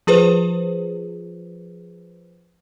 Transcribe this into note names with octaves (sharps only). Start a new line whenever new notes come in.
F3 F4 G#4 B4 C5